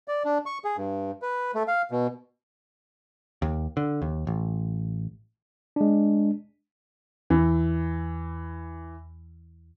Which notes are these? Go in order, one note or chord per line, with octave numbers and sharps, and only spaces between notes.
D5
D4
C#6
G#4
G2
B4
A3
F5
B2
D#2
D3
D#2
A1
G#3 D4
E2 E3